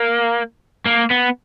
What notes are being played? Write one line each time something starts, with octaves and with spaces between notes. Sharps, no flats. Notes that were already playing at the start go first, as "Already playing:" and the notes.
Already playing: A#3
A#3
B3